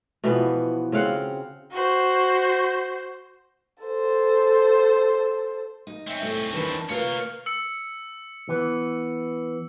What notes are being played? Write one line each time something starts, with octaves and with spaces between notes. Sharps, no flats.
B2 E3 F3 B3
C#3 C4 F5 F#5
F#4 C5
A4 C5
D#4
C4 C#4 E5
A2 A4
D#3 E3 D4 A5
A#3 F4 A#4 B4 C#5 F5
E6 C#7
E3 B3